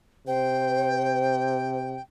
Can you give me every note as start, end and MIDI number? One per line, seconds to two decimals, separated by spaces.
0.27 1.98 48
0.27 1.82 72
0.27 2.01 79